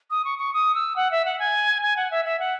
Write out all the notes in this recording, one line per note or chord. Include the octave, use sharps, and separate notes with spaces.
D#6
C#6
C#6
D#6
E6
F#5
E5
F#5
G#5
G#5
F#5
E5
E5
F#5